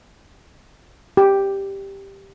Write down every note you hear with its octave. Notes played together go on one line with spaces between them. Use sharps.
G4